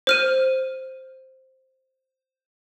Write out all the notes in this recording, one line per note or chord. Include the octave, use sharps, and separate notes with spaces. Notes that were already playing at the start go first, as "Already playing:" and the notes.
C5 F6 D#7